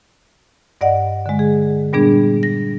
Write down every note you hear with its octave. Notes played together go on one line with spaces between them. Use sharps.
G2 D5 D#5 F#5
D3 G#3
G#4
A#2 G3 B3 D4 G#4
A#6